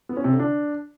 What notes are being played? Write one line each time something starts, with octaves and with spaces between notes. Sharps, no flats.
B3
C#4
C3
D3
D4